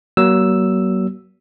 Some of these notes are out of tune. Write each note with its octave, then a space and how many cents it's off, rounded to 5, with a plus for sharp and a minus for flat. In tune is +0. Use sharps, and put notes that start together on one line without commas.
F#3 +35 A#3 +35 E6 +0